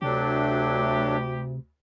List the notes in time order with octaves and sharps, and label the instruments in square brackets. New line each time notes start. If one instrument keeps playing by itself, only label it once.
[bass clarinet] D2 [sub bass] C3 [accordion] F#3 A3 D4 [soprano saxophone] G4